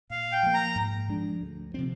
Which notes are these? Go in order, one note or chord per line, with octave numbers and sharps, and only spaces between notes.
A#2 F5
G5
F3 A#3
A#5
G#2
F3 G#3 D4
D2
C3 F3 C4